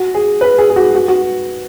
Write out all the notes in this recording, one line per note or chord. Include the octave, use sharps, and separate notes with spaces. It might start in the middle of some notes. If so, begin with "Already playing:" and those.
Already playing: F#4
G#4
B4
G#4
G#4
F#4
F#4
F#4